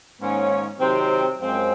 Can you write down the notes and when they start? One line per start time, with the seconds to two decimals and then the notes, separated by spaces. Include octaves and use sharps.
0.19 G#2 D#3 A#3 C#4
0.79 C3 D#3 F#3 C4
1.39 F#2 F3 G#3 C4